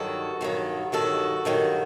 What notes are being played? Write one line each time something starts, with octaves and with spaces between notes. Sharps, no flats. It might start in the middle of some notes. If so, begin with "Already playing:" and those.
Already playing: G2 D#3 F#3 F#4 A4
G2 D#3 F#3
G2 D#3 F#3 F#4 A4
G2 D#3 F#3